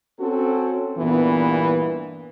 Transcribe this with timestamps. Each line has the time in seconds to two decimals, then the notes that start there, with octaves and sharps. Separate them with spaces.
0.19 C4 C#4 F#4 A4
0.98 G2 A#2 E3 B3